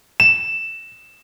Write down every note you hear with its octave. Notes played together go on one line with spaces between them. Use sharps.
E7